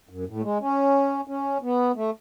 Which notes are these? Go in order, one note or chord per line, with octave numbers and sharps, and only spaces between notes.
F#2
A2
A3
G#3
C#4
C#4
B3
A3